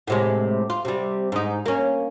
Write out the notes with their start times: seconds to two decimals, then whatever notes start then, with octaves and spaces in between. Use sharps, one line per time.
0.07 A2 C3 G#3
0.70 F4
0.85 C3 G3
1.32 G#2 D#4
1.66 A#3 C#4